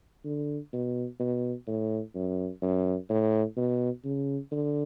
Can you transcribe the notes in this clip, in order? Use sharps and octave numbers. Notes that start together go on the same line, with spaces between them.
D3
B2
B2
A2
F#2
F#2
A2
B2
C#3
D3